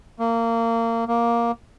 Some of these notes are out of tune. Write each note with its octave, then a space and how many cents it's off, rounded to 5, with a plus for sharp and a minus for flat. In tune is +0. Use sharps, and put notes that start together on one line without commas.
A#3 -25
A#3 +5